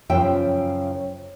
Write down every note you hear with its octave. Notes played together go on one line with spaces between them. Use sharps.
F#2 C#3 F3 E4 E5 G5